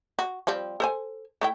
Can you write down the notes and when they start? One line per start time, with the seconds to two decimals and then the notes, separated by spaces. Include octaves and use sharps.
0.19 F#4
0.47 F3 G3 C4
0.80 A4 C5 G#5
1.41 A3 E4 G5